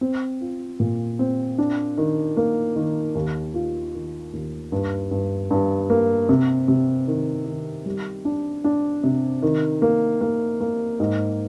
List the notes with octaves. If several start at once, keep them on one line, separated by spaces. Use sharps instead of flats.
C4
F4
A#2
C4
D4
D#3
A#3
D#3
D#2
F4
D#3
D#2
G2
G2
G2
A#3
C3
C3
D#3
D#3
G3
D4
D4
C3
D#3
A#3
A#3
A#3
G#2